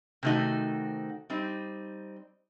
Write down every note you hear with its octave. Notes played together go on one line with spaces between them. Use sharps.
C3 D#3 A3 D#4 F#4
G3 C4 D#4